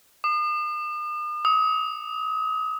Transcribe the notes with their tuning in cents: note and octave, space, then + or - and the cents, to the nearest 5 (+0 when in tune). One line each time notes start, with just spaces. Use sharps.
D#6 -45
D#6 +35